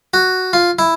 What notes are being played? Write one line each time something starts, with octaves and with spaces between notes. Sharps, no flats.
F#4
F4
E4